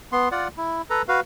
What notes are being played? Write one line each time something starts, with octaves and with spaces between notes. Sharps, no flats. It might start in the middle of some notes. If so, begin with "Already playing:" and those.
B3 C6
F4 D5 F#5
E4
A4 B4 A#5
F#4 B4 F5